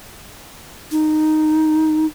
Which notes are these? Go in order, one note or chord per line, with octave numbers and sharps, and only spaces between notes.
D#4